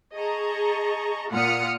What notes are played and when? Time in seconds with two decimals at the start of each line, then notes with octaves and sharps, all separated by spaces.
0.14 G#4 D#5 A5 A#5 C#6
1.30 A#2 F4 F#5 D#6 F6 C#7